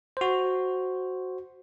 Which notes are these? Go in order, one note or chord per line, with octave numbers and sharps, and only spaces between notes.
F#4 C5